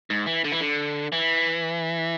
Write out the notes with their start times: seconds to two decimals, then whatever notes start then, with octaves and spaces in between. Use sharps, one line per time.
0.10 G#2
0.26 E3
0.44 D3
0.52 E3
0.61 D3
1.12 E3